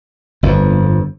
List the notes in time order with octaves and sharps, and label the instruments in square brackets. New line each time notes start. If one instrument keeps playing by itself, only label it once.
[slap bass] G1 F2